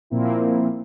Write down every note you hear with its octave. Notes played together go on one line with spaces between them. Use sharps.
A#2 F3 A#3 C4 E4